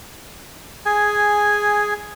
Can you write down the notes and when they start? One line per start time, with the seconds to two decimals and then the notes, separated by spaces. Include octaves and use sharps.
0.86 G#4 G#5